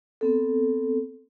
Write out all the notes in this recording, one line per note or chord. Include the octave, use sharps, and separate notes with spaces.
B3 C4 A4